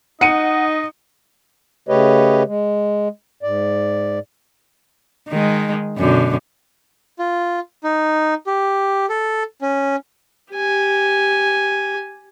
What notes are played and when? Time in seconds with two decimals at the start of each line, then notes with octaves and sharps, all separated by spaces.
0.21 D#4 D#5 F#5 C#7 D#7
1.89 C#3 A3 G4 B4 C#5 D#5
2.46 G#3
3.43 G#2 D5
5.28 D#3 G#3
5.97 F#2 B2 D3
7.19 F4
7.84 D#4
8.47 G4
9.09 A4
9.61 C#4
10.54 G4 G#5